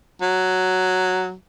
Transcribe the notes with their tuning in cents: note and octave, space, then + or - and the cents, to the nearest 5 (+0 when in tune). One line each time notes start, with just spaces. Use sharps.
F#3 +0